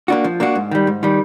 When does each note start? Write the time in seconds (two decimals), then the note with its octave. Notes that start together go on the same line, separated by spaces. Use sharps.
0.08 A#3 D4 F#4
0.24 F3
0.40 A#3 D4 F#4
0.55 G#2
0.71 D#3 G3
0.87 G#2
1.03 D#3 G3